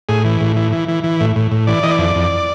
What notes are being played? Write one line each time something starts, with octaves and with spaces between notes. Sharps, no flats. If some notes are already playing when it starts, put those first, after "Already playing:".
A2 G#4
E3
A2
E3
E3
E3
E3
A2
A2
A2
E3 D5
E3 D#5
D5
F2
F2